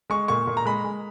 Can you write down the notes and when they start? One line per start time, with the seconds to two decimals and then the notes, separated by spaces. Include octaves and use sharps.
0.10 G#3 C#6
0.28 A#2 C#6
0.47 A#2
0.57 A#5
0.65 G#3 B5
0.84 G#3